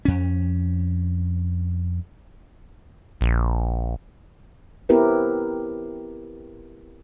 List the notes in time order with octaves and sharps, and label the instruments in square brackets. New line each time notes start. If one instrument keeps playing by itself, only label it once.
[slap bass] F2 C#4
[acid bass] A#1
[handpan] B3 C4 E4 G4 A#4 B4